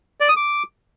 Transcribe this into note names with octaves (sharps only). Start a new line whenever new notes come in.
D5
D#6
D6